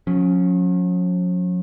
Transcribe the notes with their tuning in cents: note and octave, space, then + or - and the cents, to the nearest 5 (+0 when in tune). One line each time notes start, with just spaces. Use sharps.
F#3 -45 C#4 +0